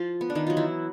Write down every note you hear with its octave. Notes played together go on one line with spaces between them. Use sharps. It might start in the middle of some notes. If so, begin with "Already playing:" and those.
Already playing: F3 F4
B3
D4
D#3 D#4
F#3 F4
E3 E4